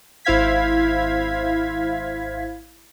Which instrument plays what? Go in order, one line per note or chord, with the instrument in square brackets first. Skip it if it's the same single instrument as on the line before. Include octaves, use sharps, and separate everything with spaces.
[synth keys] G#1 E4 C5 F5 G#6 B6